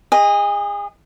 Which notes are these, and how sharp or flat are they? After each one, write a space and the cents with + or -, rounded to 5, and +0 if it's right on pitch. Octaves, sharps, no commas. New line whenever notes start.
G#4 -35 D#5 +0